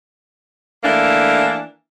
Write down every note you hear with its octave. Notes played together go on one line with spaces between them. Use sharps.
E3 A3 A#3 D4